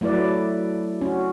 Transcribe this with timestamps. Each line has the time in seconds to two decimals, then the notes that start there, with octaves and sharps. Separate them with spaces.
0.01 F#3 A3 E4 B4 D5
1.01 C#4 F#4